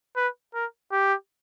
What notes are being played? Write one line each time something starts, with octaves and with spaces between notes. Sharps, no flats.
B4
A#4
G4